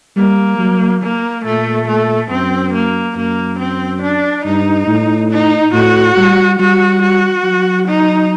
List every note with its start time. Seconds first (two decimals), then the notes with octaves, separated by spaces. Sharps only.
0.16 G3 A#3
0.59 F#3
1.02 A#3
1.45 A#2 A3
1.88 A3
2.30 F#2 C4
2.73 A#3
3.16 F#2 A#3
3.59 C4
4.02 D4
4.45 G2 D#4
4.87 A2
5.30 D#4
5.73 A2 F#4
6.17 G3
6.59 G3 F#4
7.02 F#4
7.44 F#3
7.88 D#4